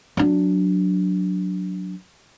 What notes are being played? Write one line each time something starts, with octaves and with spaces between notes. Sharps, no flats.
F#3 D4